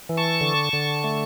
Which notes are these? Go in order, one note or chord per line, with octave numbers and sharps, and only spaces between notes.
E3
A5 C#6
D3
D3
A3